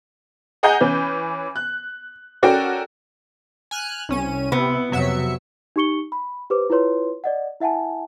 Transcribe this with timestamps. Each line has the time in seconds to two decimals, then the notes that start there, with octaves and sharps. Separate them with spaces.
0.63 G#4 D#5 F#5 G#5 A#5 G6
0.80 E3 C#4 B4
1.56 F#6
2.43 C#4 F#4 A4 A#4 D5 G5
3.71 G#5 F6 F#6
4.09 C2 C#4 D#7
4.52 C3 B3 E4
4.92 F2 C3 F#3 E5 C#7
5.76 D#4 G4 C#6 C#7 G7
6.12 B5
6.50 G4 B4 C5 D6
6.70 E4 F4 B4 C#5 C6
7.24 D5 D#5 F#5
7.60 E4 E5 F#5 G#5 A5